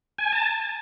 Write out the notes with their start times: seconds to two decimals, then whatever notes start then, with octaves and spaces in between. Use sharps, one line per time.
0.18 G#5
0.32 A5